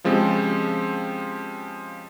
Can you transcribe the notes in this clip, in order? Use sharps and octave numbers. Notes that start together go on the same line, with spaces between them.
C#3 F3 G#3 C4 G4